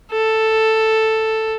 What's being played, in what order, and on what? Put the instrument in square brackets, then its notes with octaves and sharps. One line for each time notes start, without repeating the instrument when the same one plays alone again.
[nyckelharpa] A4